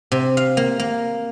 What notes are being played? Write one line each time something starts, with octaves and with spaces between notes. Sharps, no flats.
C3
F5
A#3
A#3